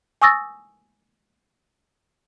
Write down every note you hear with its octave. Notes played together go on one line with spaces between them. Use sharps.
G#5 C#6 D#6 E6 A6 A#6